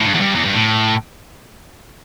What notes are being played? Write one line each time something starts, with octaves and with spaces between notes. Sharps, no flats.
A2
G2
E2
G2
E2
G2
A2